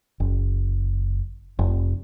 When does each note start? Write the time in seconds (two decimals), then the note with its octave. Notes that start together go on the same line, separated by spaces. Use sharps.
0.20 F#1
1.59 F1